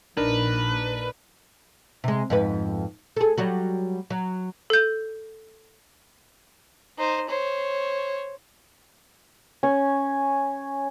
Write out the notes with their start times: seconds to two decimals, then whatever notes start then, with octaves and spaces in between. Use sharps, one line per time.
0.17 A#1 D4 D#4 A#4 B4
2.04 C3 G#3
2.30 F2 G#2 B4
3.17 G#4 A4
3.38 F#3 G3 F#4
4.10 F#3
4.70 A4 G6
6.98 D#4 C5
7.29 C5 C#5
9.63 C#4